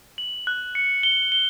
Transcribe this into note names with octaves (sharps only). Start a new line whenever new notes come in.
F#7
F#6
C#7
G7
G7